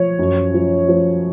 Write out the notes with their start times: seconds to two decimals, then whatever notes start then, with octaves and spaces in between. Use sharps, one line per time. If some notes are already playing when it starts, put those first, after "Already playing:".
Already playing: F3 C#5
0.19 F#2
0.54 F3
0.88 F3